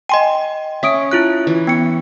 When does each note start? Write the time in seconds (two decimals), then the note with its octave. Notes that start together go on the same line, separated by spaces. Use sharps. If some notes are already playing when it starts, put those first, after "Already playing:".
0.09 D#5 G5 G#5 C6
0.83 C#4 E5 D#6 D7
1.11 E4 F4 F#6
1.47 E3
1.67 B3 G5 C#7